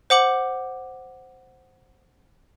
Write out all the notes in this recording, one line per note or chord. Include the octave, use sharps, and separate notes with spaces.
C5 F#5 D6 F#7